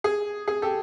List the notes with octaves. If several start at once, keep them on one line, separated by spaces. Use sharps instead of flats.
G#4
G#4
G4 A4